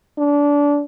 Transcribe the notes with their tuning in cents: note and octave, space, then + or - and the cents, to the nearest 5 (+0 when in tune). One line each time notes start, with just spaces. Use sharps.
D4 -25